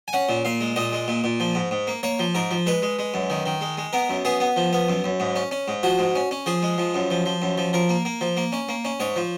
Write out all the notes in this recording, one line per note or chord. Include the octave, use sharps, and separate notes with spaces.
G#5
C#4 F#5
A#2
A#2 F5
G#3
A#2 D#5
G#3
A#2
A#2
F3
G#2
G#2
A#3
A#3 C#5
F3
G#2 A#4
F3
G#3 B4
G#3
G#3
F#2
D#3
D#3
G#3
G#3
B3 A#4
F#2
B3 G#4
B3
F3
B3
F#2
F#2
G#2
C#4
C#4
G#2
F3 F#4
G#2
C#4
C#4
F3 G#4
G#3
F3
F#2
F3
F3
F#2
F3
F3 A#4
A#3
A#3
F3
A#3
C#4
A#3
C#4
G#2 C#5
F3